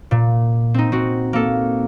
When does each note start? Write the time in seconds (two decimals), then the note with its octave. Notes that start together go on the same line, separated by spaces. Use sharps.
0.11 A#2
0.74 C4 D#4
0.92 C4 F#4
1.33 A#3 A4